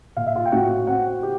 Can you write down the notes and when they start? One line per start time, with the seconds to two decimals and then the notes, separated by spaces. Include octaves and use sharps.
0.17 A#2 F5
0.26 E5
0.35 F4 F5
0.45 G5
0.52 A2 F#4 F#5
0.87 C4 F#4 F#5
1.23 G4